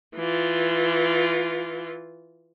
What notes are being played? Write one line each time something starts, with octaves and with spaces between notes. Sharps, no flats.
E3 F4